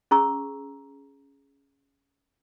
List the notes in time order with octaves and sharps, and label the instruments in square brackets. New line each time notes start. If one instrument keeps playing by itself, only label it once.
[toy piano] C#4 G#4 A#5 C#6 E6